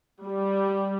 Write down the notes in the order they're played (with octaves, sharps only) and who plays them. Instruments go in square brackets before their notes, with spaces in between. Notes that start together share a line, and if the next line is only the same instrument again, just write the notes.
[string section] G3